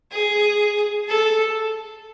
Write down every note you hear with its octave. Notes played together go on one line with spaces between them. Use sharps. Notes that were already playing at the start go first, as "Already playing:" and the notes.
G#4
A4